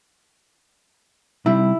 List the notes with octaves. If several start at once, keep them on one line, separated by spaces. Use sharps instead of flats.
C3 G3 E4